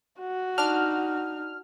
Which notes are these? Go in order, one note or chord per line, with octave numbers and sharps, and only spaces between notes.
F#4
D4 D#4 F6